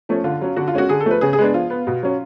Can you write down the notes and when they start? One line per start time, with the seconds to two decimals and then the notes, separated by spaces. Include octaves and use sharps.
0.09 F3 A3 C#4
0.24 D3 F4
0.41 F#3 C#4
0.56 D3 F#4
0.68 F4
0.74 G#3 C#4 F#4
0.89 D3 G#4
1.00 A4
1.06 F3 A3 B4
1.21 C#3 G#4
1.33 G#4
1.39 G#3 B3 D4
1.54 F3 F4
1.70 B3
1.87 B2
2.03 F#3 C#4